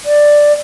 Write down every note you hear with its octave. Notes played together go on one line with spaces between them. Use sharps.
D5